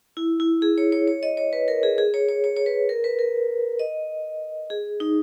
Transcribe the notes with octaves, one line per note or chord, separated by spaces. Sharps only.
E4
E4
G#4
C#5
C#5
C#5
D#5
C#5
B4
A#4
G#4
G#4
C#5
C#5
C#5
C#5
B4
A#4
B4
A#4
D#5
G#4
D#4